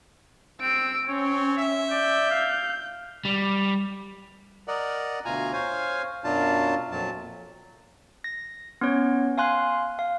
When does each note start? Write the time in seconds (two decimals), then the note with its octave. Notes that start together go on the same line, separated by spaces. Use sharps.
0.61 C4 E6 D7
1.08 C4 C#4 C#5
1.57 E5
1.91 D5 G6
2.30 F5
3.25 G3
4.68 A#4 D5 D#5 F#5
5.25 D2 B2 F4 G#5 A#5
5.53 C5 C#5 F5 G#5
6.24 F#2 B2 F#3 D4 F4 A5
6.91 F2 A#2 F#3 A5
8.24 A#6
8.81 B3 C#4 C#5
9.38 F5 G#5 C6 F#6
9.99 F5